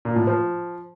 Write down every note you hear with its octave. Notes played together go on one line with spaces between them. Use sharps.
A#2
A2
F3